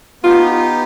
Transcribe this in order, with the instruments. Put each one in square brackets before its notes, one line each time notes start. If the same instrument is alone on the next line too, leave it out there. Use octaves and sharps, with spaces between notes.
[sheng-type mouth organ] B3 D#4 G4 [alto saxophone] F4